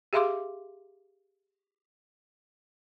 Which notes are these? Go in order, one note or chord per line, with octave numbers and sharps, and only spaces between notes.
G4 G#4 E5 F5 C6 D6